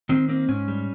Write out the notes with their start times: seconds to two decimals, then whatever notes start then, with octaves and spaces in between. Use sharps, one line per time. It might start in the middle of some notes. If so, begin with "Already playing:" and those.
0.09 D#3 C4
0.29 A#3 C4
0.48 G#2 C#4
0.68 G3